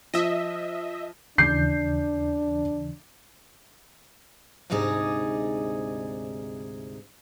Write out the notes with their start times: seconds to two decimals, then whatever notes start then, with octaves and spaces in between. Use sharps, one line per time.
0.14 F3 D#5 E5
1.38 D#2 C#3 E3 D4 G6 C7
4.70 D2 G#2 C3 D#4 G#4 D5